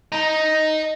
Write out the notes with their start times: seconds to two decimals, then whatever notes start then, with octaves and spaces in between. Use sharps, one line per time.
0.12 D#5 A#5